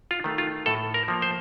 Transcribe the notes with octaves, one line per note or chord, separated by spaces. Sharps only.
F4
D#3 A3
F4
A2 A4
A#4
F3 A#3
C5